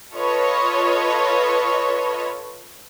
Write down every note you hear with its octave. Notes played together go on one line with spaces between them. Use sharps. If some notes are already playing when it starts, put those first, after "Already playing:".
F4 A4 B4 C#5 D#5